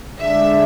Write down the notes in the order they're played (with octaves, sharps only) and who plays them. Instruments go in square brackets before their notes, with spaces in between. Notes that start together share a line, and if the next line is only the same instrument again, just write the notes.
[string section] D3 G#3 D4 E5